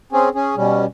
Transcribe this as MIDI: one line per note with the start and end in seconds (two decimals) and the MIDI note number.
0.12 0.29 60
0.12 0.29 61
0.12 0.29 68
0.35 0.56 61
0.35 0.56 68
0.56 0.86 47
0.56 0.86 55
0.56 0.86 61